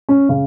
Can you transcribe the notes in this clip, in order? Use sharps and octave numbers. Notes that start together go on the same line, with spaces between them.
C#4
C#3